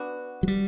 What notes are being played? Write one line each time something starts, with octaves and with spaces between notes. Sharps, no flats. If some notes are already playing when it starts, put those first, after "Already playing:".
Already playing: B3 D4 F#4
F#3
G3